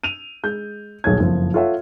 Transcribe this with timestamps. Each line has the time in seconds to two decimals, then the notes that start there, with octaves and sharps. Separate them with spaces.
0.04 D#7 F7
0.44 G#3 G6
1.04 D#1 B1 G#4 C#5 G#6
1.19 F#1 F2 F3 F4
1.54 F4 A4 C#5 E5 F#5